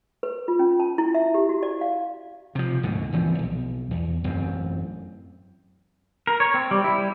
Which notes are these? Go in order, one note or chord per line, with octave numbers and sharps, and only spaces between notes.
B4
F4
C#4
A5
E4
E5
G4
F#4
D5
F5
C3 F3
D2 G#2 B2 D3
D#1 E3 F3 C4
B1
E2
A1 F#2 C4
A#4
C#5
C4
G3
E4
G3